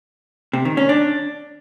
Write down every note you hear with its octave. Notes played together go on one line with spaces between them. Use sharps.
C3
D#3
C#4
D4